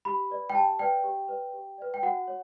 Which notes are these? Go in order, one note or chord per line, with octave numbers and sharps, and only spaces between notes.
G4 B5
B4 D5
G5
G4 A5
B4 D5 G5
G4
B4 D5
G4
B4 D5
G5
F#4 F#5
C#5